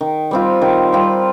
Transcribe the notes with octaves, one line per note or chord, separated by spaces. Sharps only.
D#3
G3 C4 F4
D#3
G3 C4 F4